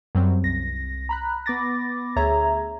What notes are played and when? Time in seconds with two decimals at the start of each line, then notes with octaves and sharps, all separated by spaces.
0.15 F#2 F#3 G3 C4
0.44 C2 A#6
1.09 A#5 B5 F#6
1.46 B3 B5 D6 A6 A#6
2.16 D2 G#4 C#5 E5 A#5 G#6